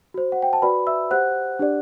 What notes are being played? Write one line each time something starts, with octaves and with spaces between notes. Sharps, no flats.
F#4 C5
F#5
G5
A5
F#4 B4 D5 B5
E5 E6
G4 C5 F#5 F#6
D4 G4 D5